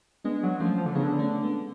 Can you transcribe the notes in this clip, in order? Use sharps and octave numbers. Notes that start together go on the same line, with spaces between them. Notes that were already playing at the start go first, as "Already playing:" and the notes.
G#3 B3 D4
F#3
F3 A3 C#4
F3
D3
C#3 B3 D4
D3
A3 C#4
G#3 B3